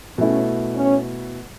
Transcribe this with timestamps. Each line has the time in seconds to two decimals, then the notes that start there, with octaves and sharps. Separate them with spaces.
0.18 B2 A3 C#4 E4
0.75 C#4